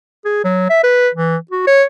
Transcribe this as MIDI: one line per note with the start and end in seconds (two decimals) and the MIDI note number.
0.25 0.43 68
0.44 0.67 54
0.70 0.83 76
0.84 1.09 71
1.15 1.37 52
1.51 1.64 66
1.67 1.84 73